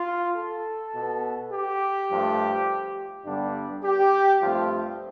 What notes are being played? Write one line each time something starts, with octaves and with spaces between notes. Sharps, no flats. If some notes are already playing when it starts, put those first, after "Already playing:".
Already playing: F4
A4
B2 B3
G4
G2 F3 A3
G2 D3 G3 B3 D4
G4
G2 F3 A3 C4 F4